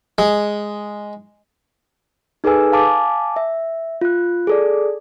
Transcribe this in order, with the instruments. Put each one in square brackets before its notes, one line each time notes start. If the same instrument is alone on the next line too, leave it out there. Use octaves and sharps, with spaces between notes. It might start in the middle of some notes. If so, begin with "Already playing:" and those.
[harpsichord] G#3
[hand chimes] D#4 G#4 A4 B4 G#5 E6
F5 G#5 A5 D6
E5
F4 F#6
G#4 A4 D5